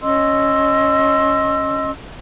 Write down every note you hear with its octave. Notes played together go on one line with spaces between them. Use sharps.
C#4 D#5 C6 E6